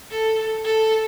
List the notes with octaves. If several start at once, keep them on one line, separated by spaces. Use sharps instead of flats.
A4
A4